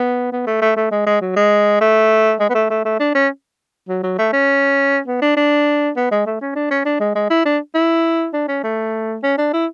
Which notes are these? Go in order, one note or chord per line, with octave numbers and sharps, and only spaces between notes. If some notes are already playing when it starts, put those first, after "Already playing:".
Already playing: B3
B3
A3
A3
A3
G#3
G#3
F#3
G#3
A3
G#3
B3
A3
A3
A3
D4
C#4
F#3
F#3
A3
C#4
B3
D4
D4
B3
G#3
A3
C#4
D4
C#4
D4
G#3
G#3
E4
D4
E4
D4
C#4
A3
C#4
D4
E4